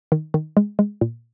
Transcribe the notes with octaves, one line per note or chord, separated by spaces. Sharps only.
D#3
D#3
G#3
G#3
A#2